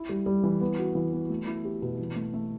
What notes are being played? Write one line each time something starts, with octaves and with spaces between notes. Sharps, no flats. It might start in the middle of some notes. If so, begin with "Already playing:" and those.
Already playing: E4
G3
G3
E3
B3
F#4
E3
B3
A3
E4
G4
B2
E3
A3
A3